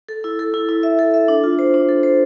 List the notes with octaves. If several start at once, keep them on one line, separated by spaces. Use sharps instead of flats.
A4
E4
A4
E4
E4
E5
A4
E5
D4
F4
C5
D4
A4
C5